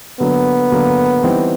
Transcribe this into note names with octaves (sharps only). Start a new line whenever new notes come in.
D3 F#3 A#3 B3
D3 F#3 A#3
E3 G3 C4 D#4